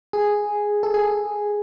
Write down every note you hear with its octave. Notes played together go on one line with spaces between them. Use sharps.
G#4
A4
G#4